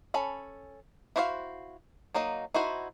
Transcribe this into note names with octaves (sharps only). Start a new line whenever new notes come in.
C#4 A4 B5
E4 F#4 C5 D#5 F5
F#3 A#3 D#4 D#5
D#4 E4 F#4 C5